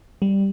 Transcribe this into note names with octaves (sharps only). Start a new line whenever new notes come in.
G3